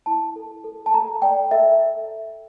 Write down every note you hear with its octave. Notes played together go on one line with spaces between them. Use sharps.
E4 A5
A4
A4
A5
A4 A#5
D5 G5
A4 E5